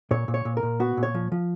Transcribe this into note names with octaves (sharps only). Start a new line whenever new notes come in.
A#2 C#5
A#2
C#5
A#2
A#4
A#2
B3 F#4
A#2
C#5
F3
F3